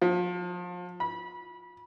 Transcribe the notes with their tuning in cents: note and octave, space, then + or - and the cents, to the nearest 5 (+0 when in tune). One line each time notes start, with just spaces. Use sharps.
F3 +30
B5 -25